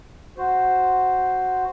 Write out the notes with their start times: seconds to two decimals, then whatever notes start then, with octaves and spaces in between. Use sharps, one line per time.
0.38 F#4 C5